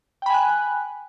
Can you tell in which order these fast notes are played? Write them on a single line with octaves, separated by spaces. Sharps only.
G5 B5 G#5 F#6